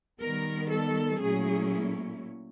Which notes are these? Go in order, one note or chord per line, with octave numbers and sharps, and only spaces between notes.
D#3 G3 B3 A#4
A4
A#2 F#3 A3 C#4 E4 G#4